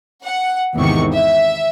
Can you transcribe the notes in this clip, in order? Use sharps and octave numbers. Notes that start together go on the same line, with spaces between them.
F#5
G#1 E2 C3 D#3 C#6
E5